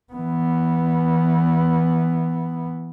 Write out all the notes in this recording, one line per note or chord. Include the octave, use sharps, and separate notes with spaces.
E3 B3